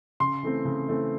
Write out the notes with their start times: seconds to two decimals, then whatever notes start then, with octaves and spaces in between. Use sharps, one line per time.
0.20 C#3 C6
0.43 E3 A3 C4
0.65 C#3
0.88 E3 A3 C4